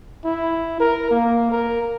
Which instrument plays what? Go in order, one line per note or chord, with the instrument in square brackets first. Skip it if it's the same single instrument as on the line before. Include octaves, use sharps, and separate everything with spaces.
[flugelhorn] E4
A#4
A#3
A#4